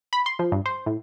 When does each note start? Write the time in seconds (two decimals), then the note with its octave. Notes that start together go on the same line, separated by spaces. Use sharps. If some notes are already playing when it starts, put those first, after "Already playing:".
0.13 B5
0.26 C6
0.39 F3
0.52 G2
0.66 C5
0.86 A2